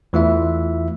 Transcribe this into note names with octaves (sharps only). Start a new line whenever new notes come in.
E2 E3 A3 E4 F4 E5